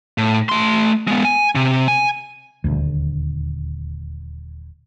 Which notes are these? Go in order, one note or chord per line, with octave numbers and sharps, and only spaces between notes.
A2
A3 C6
G#3 B3
G#5
C3
G#5
D#1 D2